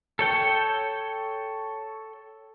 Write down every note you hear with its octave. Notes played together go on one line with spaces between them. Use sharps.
A4 C#5 G5